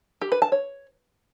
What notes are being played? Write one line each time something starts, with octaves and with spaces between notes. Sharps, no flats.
G4
B4
A5
C#5